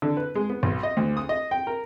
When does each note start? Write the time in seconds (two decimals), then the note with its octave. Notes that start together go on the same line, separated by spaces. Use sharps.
0.02 D3
0.17 B4
0.35 G#3
0.50 B3
0.63 B1
0.83 D#5
0.97 D2
1.17 D#6
1.29 D#5
1.51 G5
1.67 A#4